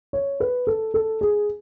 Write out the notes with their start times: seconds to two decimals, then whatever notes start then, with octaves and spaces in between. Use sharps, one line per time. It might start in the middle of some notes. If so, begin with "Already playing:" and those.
0.13 C#5
0.40 B4
0.67 A4
0.94 A4
1.21 G#4